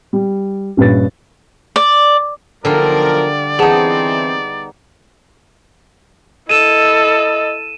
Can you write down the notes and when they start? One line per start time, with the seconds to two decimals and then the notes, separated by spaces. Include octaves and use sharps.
0.13 G3
0.77 A#1 G2 C#4 B4 A6
1.76 D5
2.65 B1 D3 F3 G3 F4 A#4 D5
3.59 E3 B3 C4 D#4 G#4 F#5 A5
6.49 E4 A4 D#5 D#7 E7